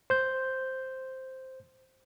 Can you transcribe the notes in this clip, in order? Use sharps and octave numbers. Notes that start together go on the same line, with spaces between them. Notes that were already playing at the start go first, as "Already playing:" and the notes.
C5 G6